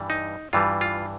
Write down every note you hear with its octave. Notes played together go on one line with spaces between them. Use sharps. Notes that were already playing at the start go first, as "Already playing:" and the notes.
Already playing: G2 E3 G3
D#4
G2 E3 G3 F4
F4